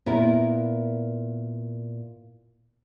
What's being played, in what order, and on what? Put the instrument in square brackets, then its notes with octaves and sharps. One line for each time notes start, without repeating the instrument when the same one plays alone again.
[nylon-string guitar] A#2 B3 E4 A#4